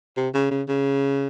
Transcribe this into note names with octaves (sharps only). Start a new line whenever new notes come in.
C3
C#3
C#3
C#3